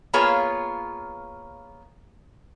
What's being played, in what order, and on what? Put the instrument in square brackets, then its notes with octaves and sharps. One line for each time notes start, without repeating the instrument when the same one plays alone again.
[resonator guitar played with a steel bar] A#3 B3 F4 G#4 C#5